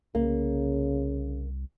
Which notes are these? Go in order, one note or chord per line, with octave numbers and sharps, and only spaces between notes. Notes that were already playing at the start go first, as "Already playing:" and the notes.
C2 C#3 A#3